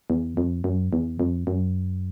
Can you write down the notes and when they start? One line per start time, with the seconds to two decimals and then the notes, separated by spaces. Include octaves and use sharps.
0.10 E2
0.37 F2
0.64 F#2
0.93 E2
1.20 F2
1.47 F#2